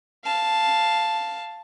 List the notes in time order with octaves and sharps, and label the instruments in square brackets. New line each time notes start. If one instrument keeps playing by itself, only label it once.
[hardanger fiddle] F5 A5